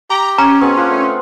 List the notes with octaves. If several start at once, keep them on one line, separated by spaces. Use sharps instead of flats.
G4 A#5
C#4 A#5
B2 B3 C4 G#4
A#3 D4 F4
A3